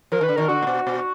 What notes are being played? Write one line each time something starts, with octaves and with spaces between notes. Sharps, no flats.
F3 A#4
D#3
B4
D3
B2 D#3 A#4
D3 F#4
A#2
B2
B2